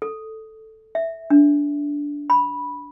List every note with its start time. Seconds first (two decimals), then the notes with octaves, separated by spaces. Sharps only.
0.02 A4
0.95 E5
1.30 D4
2.30 B5